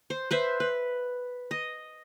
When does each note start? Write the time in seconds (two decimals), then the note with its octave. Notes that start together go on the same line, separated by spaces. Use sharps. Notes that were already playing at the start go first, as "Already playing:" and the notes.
0.10 C5
0.31 B4 C5 E5
0.60 B4
1.51 D#5